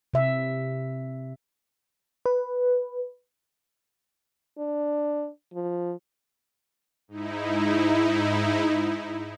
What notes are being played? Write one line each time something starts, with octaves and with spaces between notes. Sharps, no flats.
C3 E5
B4
D4
F3
G#2 D#4 E4